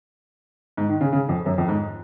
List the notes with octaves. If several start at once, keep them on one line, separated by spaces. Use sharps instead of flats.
G#2
D#3
C#3
C#3
F2
F#2
F2
G#2